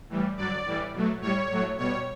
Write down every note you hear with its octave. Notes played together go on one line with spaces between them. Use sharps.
A2 E3 G3
G2 D3 F#3 D5
A2 E3 G3
B2 F#3 A3
A2 G3 C#5
A2 F#3 A3
B2 G3 C#5